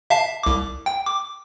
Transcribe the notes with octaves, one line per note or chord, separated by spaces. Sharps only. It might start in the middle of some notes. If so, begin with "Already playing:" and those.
E5 F5 A5
C2 D6
G5
D6